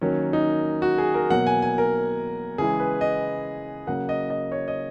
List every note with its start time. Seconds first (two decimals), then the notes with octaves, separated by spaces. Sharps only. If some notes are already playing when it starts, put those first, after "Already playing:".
0.01 D#3 F#3 A#3 C#4
0.33 D#4
0.82 F#4
0.98 G#4
1.14 A#4
1.30 B2 F#3 A#3 F#5
1.47 G#5
1.62 G#5
1.78 A#4
2.58 C#3 E3 G#3 G#4
2.80 B4
3.01 D#5
3.87 C#3 F#3 A#3 F#5
4.09 D#5
4.30 D#5
4.52 C#5
4.68 D#5